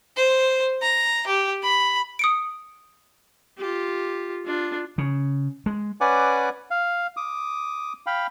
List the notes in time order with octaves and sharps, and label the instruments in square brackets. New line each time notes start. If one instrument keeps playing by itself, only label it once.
[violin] C5
A#5
G4
B5
[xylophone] D#6 C#7 D7
[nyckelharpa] F4 G4
D4 F4
[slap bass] C#3
G#3
[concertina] C#4 B4 D5 F#5 G#5 D6
F5
D6 D#6
F5 G5 B5